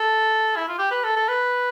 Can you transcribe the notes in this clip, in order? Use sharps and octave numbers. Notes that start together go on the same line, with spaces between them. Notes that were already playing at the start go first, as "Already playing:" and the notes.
Already playing: A4
E4
F4
G4
B4
A4
A4
B4